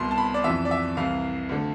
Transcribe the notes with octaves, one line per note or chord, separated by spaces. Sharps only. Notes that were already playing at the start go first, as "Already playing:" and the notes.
Already playing: C2 B2 C6
A5
B5
D5
F2 C3 E3 E5
D5
E5
C2 C3 E3 F5
D2 D3